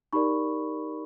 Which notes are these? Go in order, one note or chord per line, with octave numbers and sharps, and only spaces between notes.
D#4 G4 A#4 D5 B5 C#6